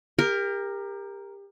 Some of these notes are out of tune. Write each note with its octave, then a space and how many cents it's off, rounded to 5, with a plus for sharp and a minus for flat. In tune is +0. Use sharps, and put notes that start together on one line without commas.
G4 +30 A#4 +0